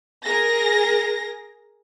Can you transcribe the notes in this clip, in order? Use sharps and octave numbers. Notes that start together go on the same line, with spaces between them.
G#4 A#4 A#6